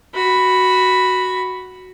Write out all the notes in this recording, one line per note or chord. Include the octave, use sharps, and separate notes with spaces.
F#4 B5